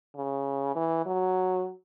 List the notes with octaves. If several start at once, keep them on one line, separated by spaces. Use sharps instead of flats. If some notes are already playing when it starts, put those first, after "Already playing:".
C#3
E3
F#3